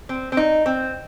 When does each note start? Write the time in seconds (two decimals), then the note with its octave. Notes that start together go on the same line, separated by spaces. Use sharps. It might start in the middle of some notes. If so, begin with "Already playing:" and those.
0.09 C4
0.32 C4
0.37 D#4
0.66 C4